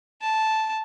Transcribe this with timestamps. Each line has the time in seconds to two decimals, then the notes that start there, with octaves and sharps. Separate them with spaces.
0.22 A5